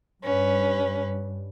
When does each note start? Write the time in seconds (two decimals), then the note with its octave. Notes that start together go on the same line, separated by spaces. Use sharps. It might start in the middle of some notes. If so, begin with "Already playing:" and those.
0.23 G2 C#4 B4